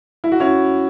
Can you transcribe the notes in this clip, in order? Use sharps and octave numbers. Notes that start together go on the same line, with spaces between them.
E4
F#4
C#4 E4